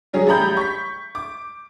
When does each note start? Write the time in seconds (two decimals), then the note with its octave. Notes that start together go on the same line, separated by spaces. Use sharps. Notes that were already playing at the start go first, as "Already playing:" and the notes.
0.13 C#3 F#3 C#4 G#4
0.27 A1 G3 A#5 B5 G6
0.57 C#6 B6
1.15 D6